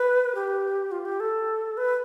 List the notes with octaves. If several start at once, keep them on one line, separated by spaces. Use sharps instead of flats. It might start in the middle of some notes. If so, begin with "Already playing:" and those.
Already playing: B4
G4
F4
G4
A4
B4